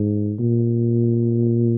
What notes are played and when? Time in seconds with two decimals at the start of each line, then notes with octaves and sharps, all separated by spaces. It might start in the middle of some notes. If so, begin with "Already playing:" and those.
Already playing: G#2
0.40 A#2